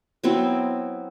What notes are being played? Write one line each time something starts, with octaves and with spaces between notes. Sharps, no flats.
F#3 B3 C4 E4